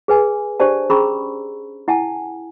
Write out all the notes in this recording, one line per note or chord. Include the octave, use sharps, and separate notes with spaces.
G#4 B4 G#5
D4 G4 C5 D5 A5
C#4 G#4 A#5 B5 C#6 E6
E4 F#5 G#5 A5